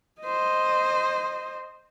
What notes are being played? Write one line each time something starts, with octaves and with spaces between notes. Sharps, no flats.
C5 D#5